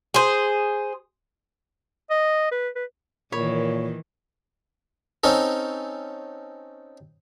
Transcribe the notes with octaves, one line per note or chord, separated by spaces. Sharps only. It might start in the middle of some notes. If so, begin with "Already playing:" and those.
G#4 C5
D#5
B4
B4
A#2 D#3 E3 C#5 B5
C4 C#4 D#4 A4